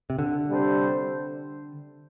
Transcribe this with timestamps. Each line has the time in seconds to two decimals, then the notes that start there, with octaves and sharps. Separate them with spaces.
0.10 C3
0.19 D3
0.48 C3 G3 D4 A4 C5